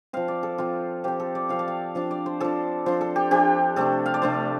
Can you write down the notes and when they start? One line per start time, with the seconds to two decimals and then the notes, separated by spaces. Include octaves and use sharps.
0.13 F3 C4 F5
0.28 D5
0.43 A4
0.58 F3 C4 F4
1.04 F3 C4 G4
1.20 A4
1.35 D5
1.49 F3 C4 F5
1.59 D5
1.68 F5
1.95 F3 D4 F5
2.11 D5
2.26 C5
2.40 F3 D4 A4
2.86 F3 D4 C5
3.01 A4
3.16 G4
3.31 F3 D4 G4
3.76 C3 A3 D4 A4
4.06 F5
4.14 D5
4.22 C3 A3 D4 C5